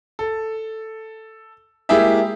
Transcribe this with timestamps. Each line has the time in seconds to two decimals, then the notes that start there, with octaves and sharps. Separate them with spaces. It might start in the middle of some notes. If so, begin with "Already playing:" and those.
0.19 A4
1.89 G#3 A#3 E4 G4 G#4 E5